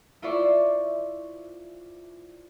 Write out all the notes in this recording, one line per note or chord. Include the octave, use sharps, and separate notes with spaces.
E4 F4 C5 D5 E5 C#6